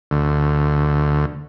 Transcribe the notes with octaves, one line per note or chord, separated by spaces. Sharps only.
D2